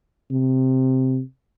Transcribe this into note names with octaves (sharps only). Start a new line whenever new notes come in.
C3